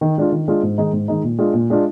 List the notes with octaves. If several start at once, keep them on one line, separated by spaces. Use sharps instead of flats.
D#3
G#3 D4 F4
D#3
G#3 D4 F4
G#2
D#3 G#3 D#4
G#2
D#3 G#3 D#4
A#2
G#3 D4 F4
A#2
G#3 D4 F4